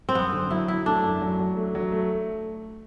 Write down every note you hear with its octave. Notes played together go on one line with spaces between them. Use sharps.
C4
F#2 B3
D3
F#3 E4
F#3 E4
A3 D4
F#2
F#3
F#3
A3
F#3
A3